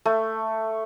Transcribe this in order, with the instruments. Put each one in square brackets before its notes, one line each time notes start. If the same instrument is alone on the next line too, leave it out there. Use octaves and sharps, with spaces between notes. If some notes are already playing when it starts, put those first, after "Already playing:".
[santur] A3